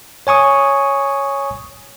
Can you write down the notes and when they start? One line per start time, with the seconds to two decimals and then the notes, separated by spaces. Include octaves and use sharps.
0.27 C#5 G#5 C#6 D#6